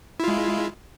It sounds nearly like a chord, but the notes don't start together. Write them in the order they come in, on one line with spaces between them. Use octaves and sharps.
E4 F4 G#3